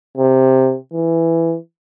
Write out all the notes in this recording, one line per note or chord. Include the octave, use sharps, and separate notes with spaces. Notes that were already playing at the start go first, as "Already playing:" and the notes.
C3
E3